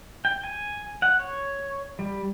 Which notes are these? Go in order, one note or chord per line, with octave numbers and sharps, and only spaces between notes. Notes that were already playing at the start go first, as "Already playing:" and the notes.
G5
G#5
F#5
C#5
G3